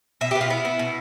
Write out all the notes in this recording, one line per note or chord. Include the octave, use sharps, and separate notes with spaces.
B2 E5
B3 G4
F4
B3 E4
B3
B2